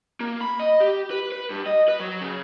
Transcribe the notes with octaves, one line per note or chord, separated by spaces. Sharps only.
A#3
B5
D#5
G4
B4
B4
G2
D#5
B4
F#3
C#3